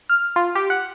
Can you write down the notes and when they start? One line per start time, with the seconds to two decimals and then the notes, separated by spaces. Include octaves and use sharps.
0.09 F6
0.36 F4
0.55 G4
0.70 F#5